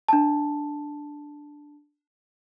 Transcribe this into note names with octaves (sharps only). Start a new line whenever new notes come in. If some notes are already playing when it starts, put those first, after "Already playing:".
D4 A5